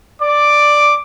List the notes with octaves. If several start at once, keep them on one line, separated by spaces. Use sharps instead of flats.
D5 D6